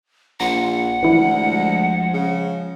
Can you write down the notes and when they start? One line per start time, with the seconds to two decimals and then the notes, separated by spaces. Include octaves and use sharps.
0.40 A#1 F#5 A#5 C6
1.03 D2 E3 F3 G#3 E4
2.13 C#3